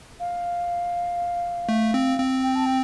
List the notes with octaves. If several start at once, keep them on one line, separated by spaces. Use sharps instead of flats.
F5
A3
C4
C4
G5
A5
G5